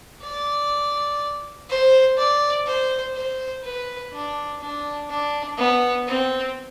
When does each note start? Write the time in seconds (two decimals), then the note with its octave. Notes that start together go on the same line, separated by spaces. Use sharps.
0.23 D5
1.70 C5
2.17 D5
2.66 C5
3.15 C5
3.64 B4
4.13 D4
4.61 D4
5.09 D4
5.58 B3
6.07 C4